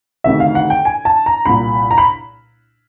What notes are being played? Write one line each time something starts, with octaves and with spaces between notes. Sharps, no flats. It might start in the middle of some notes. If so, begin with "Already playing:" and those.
D2 C3 D#3 E5
F5
F#5
G5
G#5
A5
A#5
C2 A#2 B5
A#5
B5